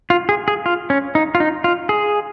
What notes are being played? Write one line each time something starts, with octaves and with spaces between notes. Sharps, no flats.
F4
G#4
G#4
F4
C#4
D#4
F4
D#4
F4
G#4